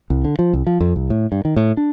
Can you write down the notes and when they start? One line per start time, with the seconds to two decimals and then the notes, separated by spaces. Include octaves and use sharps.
0.10 C2
0.25 D3
0.39 F3
0.53 C2
0.67 F3
0.80 F2
0.96 C2
1.10 A2
1.32 G2
1.45 D#3
1.56 A2
1.77 D4